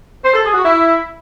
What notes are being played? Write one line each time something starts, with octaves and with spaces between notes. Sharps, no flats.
C5
A4
G#4
F#4
E4